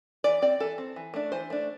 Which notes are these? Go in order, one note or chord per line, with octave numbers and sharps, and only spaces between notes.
E3 D5
C4 D5
E3 A4
C4
E3
A3 D4
E3 C5
A3 D4